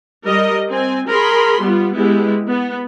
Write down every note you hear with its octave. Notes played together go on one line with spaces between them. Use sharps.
G3 A#4 D#5
C4 G#5
G#4 A#4 B5 C6
G3 B3 F4
G#3 B3 E4 G4
B3